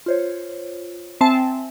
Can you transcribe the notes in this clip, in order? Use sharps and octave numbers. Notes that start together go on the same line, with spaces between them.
F4 C5 C#5
C4 E5 G#5 A5